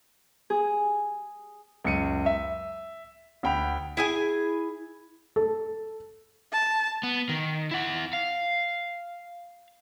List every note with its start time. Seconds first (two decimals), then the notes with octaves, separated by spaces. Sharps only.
0.50 G#4
1.84 C#2 F#2 C#7 D#7
2.26 E5
3.43 D2 F#5 G5 B5 F7
3.97 E4 G#4 G#5
5.36 A4
6.53 A5
7.03 B3
7.29 D#3
7.71 E4 F#5
8.13 F5